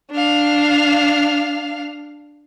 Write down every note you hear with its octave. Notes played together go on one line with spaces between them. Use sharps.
D4 F5